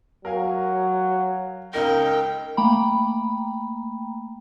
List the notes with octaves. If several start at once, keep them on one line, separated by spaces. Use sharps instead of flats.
F#3 A#4 F5 G#5
C#2 D#4 A#4 G5 A#6
A3 A#3 G5 A#5 B5